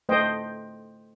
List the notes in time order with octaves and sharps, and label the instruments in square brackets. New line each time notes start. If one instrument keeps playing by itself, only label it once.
[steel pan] A3 C5 D#5 G5